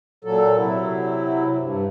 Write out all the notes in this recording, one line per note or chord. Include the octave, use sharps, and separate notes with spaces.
A#2 F#3 A4
C3 F#3 E4
G2